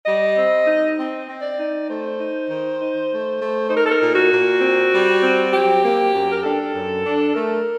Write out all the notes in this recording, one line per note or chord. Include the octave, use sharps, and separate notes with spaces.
G3 D#5
C4
D#4
C4
C4
D5
D#4
A3 C5
D#4
D#3
D#4
A3
A3
D#4 C5
A#4
A4
A#4
A#2
F#4
A#2
C4
G3
C4
F#3 G4
A#3
F#2
A#4
D4 A4
F#2
D4
A3 A#4